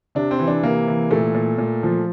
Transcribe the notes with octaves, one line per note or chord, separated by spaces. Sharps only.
C3 D4
C4
E3
D4
C3 A#3
E3
A#2 A3
A#2
A#2
F3